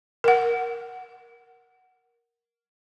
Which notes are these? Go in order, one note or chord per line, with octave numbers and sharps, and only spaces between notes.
A#4 F#5